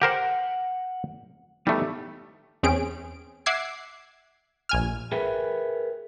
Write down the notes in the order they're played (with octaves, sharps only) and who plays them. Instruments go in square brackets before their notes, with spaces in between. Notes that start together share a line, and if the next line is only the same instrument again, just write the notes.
[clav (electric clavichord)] G4 A#4 C5 [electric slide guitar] F#5
[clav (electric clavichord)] G3 A3 [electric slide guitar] B3 D#4 G4
[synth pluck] E2 C4 C#4 G#4 D7
E5 F#5 D6 E6 G#6 C7
A#1 G#5 F6
[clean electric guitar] G#4 A#4 B4 E5 G5